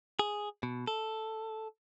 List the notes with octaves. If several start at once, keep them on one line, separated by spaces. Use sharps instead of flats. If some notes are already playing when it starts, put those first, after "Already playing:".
G#4
B2
A4